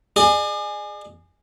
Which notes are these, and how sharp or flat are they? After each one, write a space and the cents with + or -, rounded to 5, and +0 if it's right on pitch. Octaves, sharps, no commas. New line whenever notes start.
G#4 +0 D5 +45